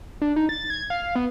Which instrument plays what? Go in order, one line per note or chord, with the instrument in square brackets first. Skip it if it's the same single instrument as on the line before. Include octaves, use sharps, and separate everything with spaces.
[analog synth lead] D4
D#4
A6
G#6
F5
B3